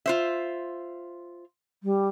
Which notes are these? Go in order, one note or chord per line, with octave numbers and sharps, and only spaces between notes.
F4 C5 E5
G3